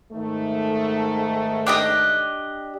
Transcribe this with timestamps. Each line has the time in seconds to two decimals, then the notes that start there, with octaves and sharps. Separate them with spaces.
0.12 G#2 D#3 A3
1.67 D4 G4 D#5